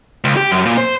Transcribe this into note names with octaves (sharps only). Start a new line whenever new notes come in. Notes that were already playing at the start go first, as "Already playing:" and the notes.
C#2
G4
F#2
A#2
C5